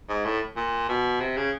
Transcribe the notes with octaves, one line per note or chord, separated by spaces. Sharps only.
G#2
A2
A#2
B2
C3
C#3